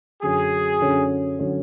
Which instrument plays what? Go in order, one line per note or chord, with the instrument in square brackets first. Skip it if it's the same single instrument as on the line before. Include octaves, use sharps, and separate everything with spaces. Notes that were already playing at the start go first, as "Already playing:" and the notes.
[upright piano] F#2 D3 F#3 C#4 [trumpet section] G#4
[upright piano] F#2 D3 F#3 C#4
D3 F#3 C#4